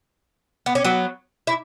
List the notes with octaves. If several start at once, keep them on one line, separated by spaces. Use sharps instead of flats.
B3
C#4
F#3 B3
E4